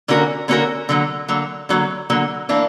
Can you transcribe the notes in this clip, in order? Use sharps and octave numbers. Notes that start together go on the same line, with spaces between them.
D3 A#3 C#4 F#4 A#4
D3 A#3 C#4 F#4 A#4
D3 F#3 A#3
D3 F#3 A#3
D3 F#3 A#3
D3 F#3 A#3
E3 A#3 D4